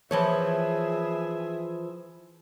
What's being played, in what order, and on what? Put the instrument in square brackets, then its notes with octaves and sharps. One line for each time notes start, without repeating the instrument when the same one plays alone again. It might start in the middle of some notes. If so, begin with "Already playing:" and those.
[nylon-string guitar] E3 F3 C#5 [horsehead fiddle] G#4 E5